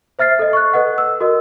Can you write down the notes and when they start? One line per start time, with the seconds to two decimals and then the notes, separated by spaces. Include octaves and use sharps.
0.19 C5 E5 F6 A6 C7
0.39 A4 D#5
0.53 C#6 F#6
0.73 A4 B4 D#5 F#5
0.98 E6
1.20 F#4 A#4 D#5